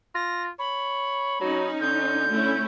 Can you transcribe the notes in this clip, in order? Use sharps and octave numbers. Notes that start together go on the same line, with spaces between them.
F4 A#6
C#5 B5
F#3 C#4 D#4
D3 G6
A3 C#4 E4